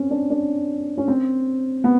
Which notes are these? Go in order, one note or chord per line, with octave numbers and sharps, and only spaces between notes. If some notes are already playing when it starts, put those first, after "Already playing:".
Already playing: C4 C#4
D4
D4
C#4
C4
B3